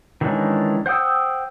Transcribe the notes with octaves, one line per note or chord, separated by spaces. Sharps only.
D#3 E3 G#3 C#4 D4
C5 F#5 G5 D#6 E6